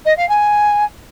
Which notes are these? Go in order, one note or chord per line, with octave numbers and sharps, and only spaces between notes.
D#5
F5
G#5